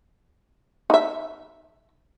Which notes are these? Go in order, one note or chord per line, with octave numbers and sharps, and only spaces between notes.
D#4 E5